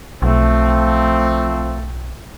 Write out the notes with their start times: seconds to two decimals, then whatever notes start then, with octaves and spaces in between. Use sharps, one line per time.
0.22 B1 F3 A3 C4